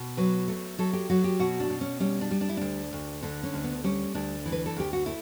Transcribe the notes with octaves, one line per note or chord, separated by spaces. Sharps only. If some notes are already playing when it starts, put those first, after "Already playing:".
Already playing: B2
F#3 B4
A3
F#3 A4
G4
F#3 F#4
G4
B2 F#4
D4
B2
C#4
G3 C#4
D4
G3
D4
E4
D2 D4
D2
D3 D4
C#4
D2
B3
G3 C#4
D2 D4
E3
B4
A4
D2 G4
F#4
A3 E4